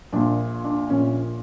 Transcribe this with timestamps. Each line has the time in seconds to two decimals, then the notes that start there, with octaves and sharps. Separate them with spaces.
0.13 A#1 A#2 D4
0.64 D4
0.90 A#1 A#2 C#4